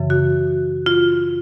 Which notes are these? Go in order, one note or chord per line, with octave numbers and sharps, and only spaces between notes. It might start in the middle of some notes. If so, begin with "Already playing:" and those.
Already playing: F#2 C#3 E3
F#4
F4